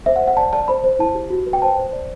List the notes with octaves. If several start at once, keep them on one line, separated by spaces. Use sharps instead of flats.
C5 E5
F#5
C5
F#5
D5 A5
D5 A5
C5 B5
C5
E4 A5
G4
F#4
B4
G5
C5 A5
C5
D5